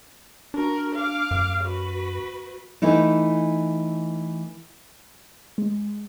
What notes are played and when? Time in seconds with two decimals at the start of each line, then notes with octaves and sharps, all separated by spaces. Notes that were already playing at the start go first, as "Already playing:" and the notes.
0.54 D4 F#4 A#4
0.96 F5 D6
1.31 F#2
1.64 F#4 B4
2.82 E3 A3 D#4 E4
5.58 G#3